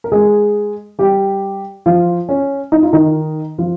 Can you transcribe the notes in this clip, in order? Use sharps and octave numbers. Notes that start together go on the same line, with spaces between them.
A#4
G#3 G#4
G3 G4
F3 F4
C#4
D#4
F4
D#3 D#4
F3 F4